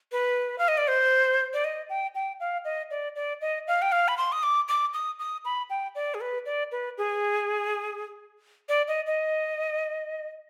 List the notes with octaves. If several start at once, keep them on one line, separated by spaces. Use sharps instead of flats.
B4
F5
D#5
D5
C5
D5
D#5
G5
G5
F5
D#5
D5
D5
D#5
F5
G5
F5
B5
C6
D#6
D6
D6
D#6
D#6
B5
G5
D5
G#4
B4
D5
B4
G#4
D5
D#5
D#5